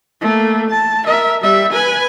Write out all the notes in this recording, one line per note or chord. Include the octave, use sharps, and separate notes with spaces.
A3 A#3
A5
A#4 E5
G3 E5
B4 G#5